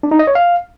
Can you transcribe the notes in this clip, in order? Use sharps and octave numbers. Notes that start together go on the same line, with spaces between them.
D4
D#4
D#5
C#5
F5